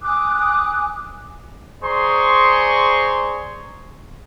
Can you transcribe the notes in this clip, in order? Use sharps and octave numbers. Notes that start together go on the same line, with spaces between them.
G#5 D6 D#6 F#6
G#4 C5 D5 A#5 C6 C#6